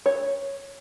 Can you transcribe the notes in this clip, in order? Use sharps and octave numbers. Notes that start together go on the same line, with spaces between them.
C#5